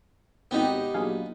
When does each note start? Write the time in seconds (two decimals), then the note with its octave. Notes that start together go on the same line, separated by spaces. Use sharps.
0.51 G#1 C3 B3 D#4 G4
0.94 A#1 F#3 G#4 F5